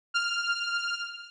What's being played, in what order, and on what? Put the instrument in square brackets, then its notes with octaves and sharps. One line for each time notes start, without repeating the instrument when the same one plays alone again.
[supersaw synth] F6